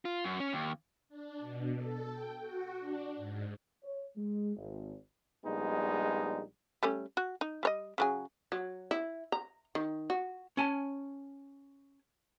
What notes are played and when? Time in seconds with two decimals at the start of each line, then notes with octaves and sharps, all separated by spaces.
0.05 F4
0.25 F#2
0.40 C#4
0.53 D#2
1.09 D4
1.39 B2
1.77 A4
2.11 G5
2.41 F#4
2.79 D4
3.16 G#2
3.83 C#5
4.16 G#3
4.56 G#1
5.45 A#1 G3 G#3 B3 D#4
6.83 G3 A3 C#4
7.17 F#4
7.41 D#4
7.63 G3 C#5 D#5
7.98 C#3 F#3 G#4
8.52 F#3
8.91 E4
9.32 A#5
9.75 D#3
10.10 F#4
10.57 C#4 G#5 A5